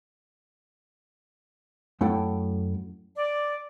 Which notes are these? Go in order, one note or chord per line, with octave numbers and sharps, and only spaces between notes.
F#2 A3 E4 A4 F#5 G5
D5